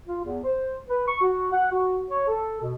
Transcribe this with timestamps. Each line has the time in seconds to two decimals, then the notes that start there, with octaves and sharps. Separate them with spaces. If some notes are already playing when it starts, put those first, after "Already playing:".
0.07 F4
0.24 E2
0.44 C5
0.88 B4
1.08 C#6
1.21 F#4
1.52 F#5
1.71 F#4
2.10 C#5
2.28 A4
2.61 B2